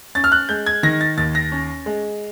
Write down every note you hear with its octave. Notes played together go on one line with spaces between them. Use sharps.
C#4 A6
F6
F#6
G#3 G6
G#6
D#3 A#6
A6
D#2 A6
A#6
C#4
G#3